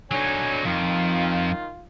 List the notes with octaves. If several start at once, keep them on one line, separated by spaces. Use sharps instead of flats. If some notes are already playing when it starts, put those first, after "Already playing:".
D3 F#3 D#4 C#5 G#5
F2 D#3 F4